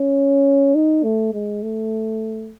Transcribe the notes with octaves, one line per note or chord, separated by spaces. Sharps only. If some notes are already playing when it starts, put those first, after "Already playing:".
Already playing: C#4
D#4
A3
G#3
A3